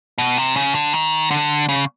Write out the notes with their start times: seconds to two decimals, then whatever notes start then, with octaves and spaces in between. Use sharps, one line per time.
0.18 B2
0.37 C3
0.56 C#3
0.75 D3
0.93 D#3
1.31 D3
1.69 C#3